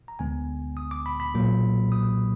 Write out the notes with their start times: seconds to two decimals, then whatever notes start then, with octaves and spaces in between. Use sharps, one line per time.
0.08 A#5
0.19 D2 D3 G#3 B3 G#5
0.77 D#6
0.91 D6
1.06 B5
1.20 B5
1.34 B1 A#2 F#3 A#3
1.92 D#6